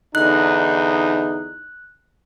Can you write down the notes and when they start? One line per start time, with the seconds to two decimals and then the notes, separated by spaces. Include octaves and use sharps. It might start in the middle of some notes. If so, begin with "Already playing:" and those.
0.15 E2 D3 D#4 F#6